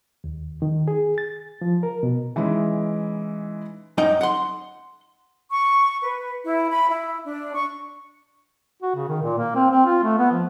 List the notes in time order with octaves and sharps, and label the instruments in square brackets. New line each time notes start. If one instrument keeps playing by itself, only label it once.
[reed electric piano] D#2
D#3
G#4
A6
F3
A#4
B2
[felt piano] E3 G#3 C#4 D#4 E4
[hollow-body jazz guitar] F#2 D#4 G5
F#5 C6
[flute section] C#6
B4
E4
B5
E4
D4
C#6
[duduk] F#4
C#3
D#3
A#2
A#3
C4
C4
F4
A3
B3
F3